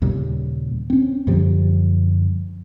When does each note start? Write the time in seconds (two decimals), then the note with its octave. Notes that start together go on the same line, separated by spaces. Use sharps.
0.02 D#2 A#2 C#3 G3
0.90 C4 C#4
1.27 F#2 D3 F3 G3